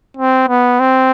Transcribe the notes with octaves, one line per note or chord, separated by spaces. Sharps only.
C4
B3
C4